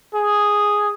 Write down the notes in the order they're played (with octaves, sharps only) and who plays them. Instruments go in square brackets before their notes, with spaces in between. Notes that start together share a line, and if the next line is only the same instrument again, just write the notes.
[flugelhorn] G#4